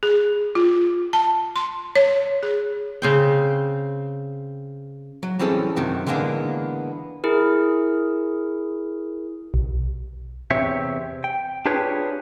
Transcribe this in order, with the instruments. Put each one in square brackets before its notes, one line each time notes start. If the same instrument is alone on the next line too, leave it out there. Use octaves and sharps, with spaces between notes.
[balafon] G#4
F4
A5
C6
C#5
G#4
[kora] C#3 C4 G5
[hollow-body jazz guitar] F#3
E3 G3 C4 C#4 G#4 A4
F#2 C3 D#3 F#3
D3 E3 G#3 A#3 B3 D4
[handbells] E4 G#4 A#4
[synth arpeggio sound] B1
[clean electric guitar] E2 C3 C4 G4 C#5 E5
G5
D4 F4 G4 G#4 B4 C#5